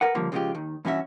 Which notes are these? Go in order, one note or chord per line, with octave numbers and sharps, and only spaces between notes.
A#4 B4 F#5
C#2 D3 F3 G3 A#3
C#3 F3 G#3 E4 F4 G4
D#2 D#3
G2 E3 C#4 F#4 E5